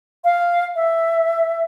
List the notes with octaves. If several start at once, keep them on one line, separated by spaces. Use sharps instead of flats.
F5
E5